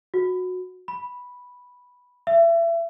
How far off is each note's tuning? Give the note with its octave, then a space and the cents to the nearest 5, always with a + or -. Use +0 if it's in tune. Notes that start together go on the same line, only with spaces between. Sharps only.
F#4 -15
B5 -5
E5 +30